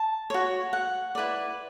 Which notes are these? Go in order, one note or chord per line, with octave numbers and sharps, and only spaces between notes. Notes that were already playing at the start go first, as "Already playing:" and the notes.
Already playing: A5
F#4 C#5
F#5
E4 B4 D5